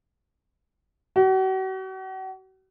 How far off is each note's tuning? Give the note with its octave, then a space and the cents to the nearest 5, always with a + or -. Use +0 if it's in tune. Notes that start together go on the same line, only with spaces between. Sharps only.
F#4 +40